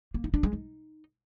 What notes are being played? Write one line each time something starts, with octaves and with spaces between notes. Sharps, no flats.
A#3
D#4
D4
G#3
D#4